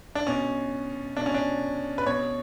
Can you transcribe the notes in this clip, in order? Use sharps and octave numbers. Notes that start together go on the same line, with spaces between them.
D4
B2 C#4
B2 D4
C#4
D4
B4
B2 C#5